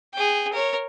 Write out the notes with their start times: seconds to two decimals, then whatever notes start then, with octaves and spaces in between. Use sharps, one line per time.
0.14 G#4 G5
0.53 A#4 C#5